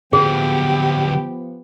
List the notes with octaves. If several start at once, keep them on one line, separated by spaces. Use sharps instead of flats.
D3 F3 F#3 B3 G4 G#4